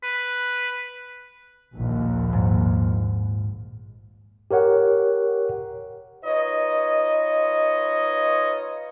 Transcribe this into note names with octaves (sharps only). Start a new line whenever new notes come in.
B4
A#1 D#2
G#2
G4 A#4 C#5 F#5
D#4 F4 B4 C#5 D#5